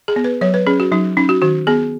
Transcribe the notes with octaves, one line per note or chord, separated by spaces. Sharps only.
G#4
B3
B4
F#3 C#5
B4
C#4 G#4
F#4
F#3 D#4
C#4 D#4
F#4
D#3 F#4
B3 G#4